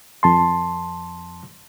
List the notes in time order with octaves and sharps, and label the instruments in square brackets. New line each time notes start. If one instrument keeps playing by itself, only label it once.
[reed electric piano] F2 A5 C6